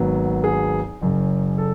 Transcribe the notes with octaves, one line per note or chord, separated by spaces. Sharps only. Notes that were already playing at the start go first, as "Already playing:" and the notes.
Already playing: G#1 G#2 F#3 B3
G#4
F#1 F#2 C#3
A4